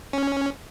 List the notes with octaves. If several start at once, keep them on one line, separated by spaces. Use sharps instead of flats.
C#4